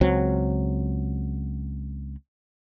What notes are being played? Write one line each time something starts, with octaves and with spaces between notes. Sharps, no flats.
C#2 F#3 C4